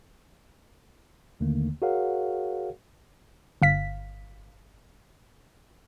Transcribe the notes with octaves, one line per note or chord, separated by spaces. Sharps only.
D#2 D3 D#3 A3 A#3
F#4 G#4 A#4 C#5 F5 F#5
G1 F5 B6